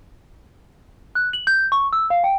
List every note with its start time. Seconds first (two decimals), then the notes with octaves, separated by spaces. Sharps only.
1.15 F#6
1.33 F#7
1.47 G6
1.72 C#6
1.93 E6
2.10 F5
2.24 G5